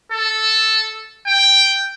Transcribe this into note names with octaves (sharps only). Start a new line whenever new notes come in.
A4
G5